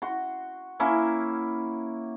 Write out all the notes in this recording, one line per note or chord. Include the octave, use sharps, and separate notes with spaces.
F#4 C6
A#3 C#4 E4